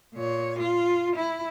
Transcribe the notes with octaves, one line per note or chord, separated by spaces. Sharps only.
A#2 C#5
F4
E4